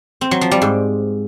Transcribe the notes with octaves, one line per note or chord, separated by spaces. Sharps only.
C4
F#3
F3
G3
G#2